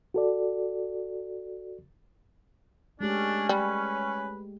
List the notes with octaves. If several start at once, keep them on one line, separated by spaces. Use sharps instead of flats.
F#4 A4 D5
G#3 A3 C#4 D4 G4
G3 B4